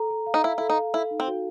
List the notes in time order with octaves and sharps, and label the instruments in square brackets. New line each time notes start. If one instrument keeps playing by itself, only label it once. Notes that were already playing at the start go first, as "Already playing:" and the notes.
Already playing: [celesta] A4 A#5
A4
F5
[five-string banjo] D#4
[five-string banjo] E4 [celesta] F5
[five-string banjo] E4 [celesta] A4
[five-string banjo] D#4
[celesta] F5
[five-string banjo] E4 [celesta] A4
[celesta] D#4
[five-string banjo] C4
[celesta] F#4